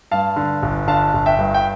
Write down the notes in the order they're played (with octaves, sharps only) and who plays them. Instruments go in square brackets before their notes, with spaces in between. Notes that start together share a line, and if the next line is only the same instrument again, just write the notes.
[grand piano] G2 F5 A5
D3
G1
D3 F5 A5
G1
E5 G5
G2
G5